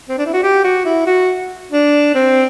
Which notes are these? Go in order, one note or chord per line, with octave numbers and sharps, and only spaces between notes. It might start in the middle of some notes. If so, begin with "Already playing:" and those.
C4
D4
E4
F#4
G4
F#4
E4
F#4
D4
C4